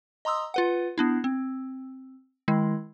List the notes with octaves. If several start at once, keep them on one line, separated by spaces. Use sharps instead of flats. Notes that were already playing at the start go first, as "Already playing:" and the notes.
D#5 A#5 C6 D#6 E6
F4 B4 F#5
B3 D4 E4
C4
D#3 G#3 E4